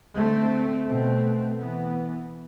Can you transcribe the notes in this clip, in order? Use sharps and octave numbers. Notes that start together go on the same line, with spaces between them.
D3 A3 C4
B2 A3 C4
E3 B3